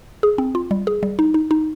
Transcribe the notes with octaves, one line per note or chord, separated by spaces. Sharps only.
G#4
C4
F4
G3
G#4
G3
D#4
D#4
D#4